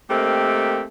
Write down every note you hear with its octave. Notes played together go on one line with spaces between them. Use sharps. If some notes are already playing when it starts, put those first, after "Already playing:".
A3 A#3 C4 D#4 G4 A#4